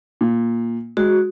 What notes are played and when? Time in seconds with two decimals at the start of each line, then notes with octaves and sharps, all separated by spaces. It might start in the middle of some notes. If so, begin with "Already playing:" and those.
0.21 A#2
0.97 G#3 F#4